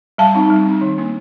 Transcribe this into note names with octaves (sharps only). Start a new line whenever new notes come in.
G3 F5 A5
C4 D#4
G3
C4 D#4
D#3
A#3 D4